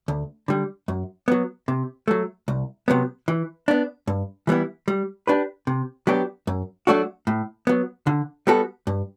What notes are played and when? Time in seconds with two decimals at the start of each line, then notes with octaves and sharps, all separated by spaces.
0.08 D2
0.48 D3 G3
0.88 F#2
1.28 F#3 B3
1.68 C3
2.08 F#3 A3
2.48 C2
2.88 C3 F#3 B3
3.28 E3
3.68 B3 D4
4.07 G2
4.47 E3 G3 B3 E4
4.88 G3
5.27 D4 G4 B4
5.67 C3
6.07 F#3 B3 D4 G4
6.47 F#2
6.87 F#3 A3 D4 F#4
7.27 A2
7.67 F#3 B3
8.07 D3
8.47 G3 B3 F#4 A4
8.87 G2